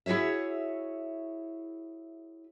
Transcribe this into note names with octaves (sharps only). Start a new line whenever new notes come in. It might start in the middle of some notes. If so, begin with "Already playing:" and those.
E4 F#4 G#4 C#5 E5